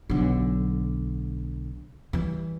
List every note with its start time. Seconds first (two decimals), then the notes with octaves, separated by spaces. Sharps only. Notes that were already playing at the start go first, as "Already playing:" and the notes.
0.10 B1 D3
2.13 E3 G3